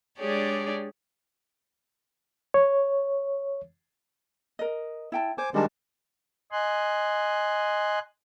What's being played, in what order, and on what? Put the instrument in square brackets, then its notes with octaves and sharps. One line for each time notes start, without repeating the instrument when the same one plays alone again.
[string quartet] G#3 D4 G4 G#4 C#5 D5
[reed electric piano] C#5
[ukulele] A#4 D#5
E4 G5 A5
[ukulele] C5 [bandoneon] G#5 D6
[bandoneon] D#3 G3 G#3 [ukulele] D4 F#4 A5
[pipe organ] D#5 G#5 C6 F#6